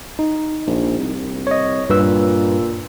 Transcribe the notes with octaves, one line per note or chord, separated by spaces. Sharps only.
D#4
A#1
C2
C#5 D#5
G2 A#2 B4 E6